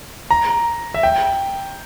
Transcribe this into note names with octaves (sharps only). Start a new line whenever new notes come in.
A#5
E5
G5